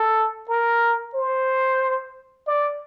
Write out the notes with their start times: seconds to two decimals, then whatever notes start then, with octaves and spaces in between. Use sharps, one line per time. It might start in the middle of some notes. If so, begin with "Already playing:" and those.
Already playing: A4
0.49 A#4
1.15 C5
2.47 D5